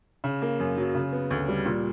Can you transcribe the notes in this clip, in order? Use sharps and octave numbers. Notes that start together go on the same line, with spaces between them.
C#3
A#3
F#2
F#3
C#3
B3
D2
G3
A#2